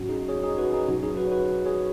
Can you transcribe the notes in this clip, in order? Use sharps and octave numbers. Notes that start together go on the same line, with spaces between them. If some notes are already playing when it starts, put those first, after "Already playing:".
Already playing: G#2 F#3 C#4 F#4
D#4 G#4
G#4 C#5
D#4 G#4
F#4 B4
D#4 G#4
B2 F#3 C#4 F#4
D#4 G#4
F#4 B4
C#5
F#4 B4
G#4 C#5